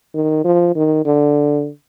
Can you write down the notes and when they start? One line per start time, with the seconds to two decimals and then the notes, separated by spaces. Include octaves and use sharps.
0.14 D#3
0.44 F3
0.76 D#3
1.05 D3